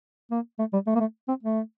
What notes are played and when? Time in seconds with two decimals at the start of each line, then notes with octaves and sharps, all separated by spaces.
0.31 A#3
0.59 A3
0.73 G3
0.87 A3
0.95 A#3
1.00 A3
1.28 C4
1.43 A3